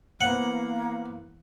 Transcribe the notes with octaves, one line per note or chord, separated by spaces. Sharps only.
E3 A#3 B3 C5 F#5